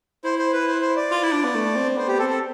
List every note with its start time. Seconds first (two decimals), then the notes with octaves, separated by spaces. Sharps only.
0.24 E4 C5
0.39 C5
0.52 B4
0.67 C5
0.82 C5
0.96 D5
1.11 F4
1.23 E4
1.32 D4
1.44 B3
1.55 A3
1.75 C4
1.97 B3 C5
2.08 G4
2.19 C4 A4
2.29 A4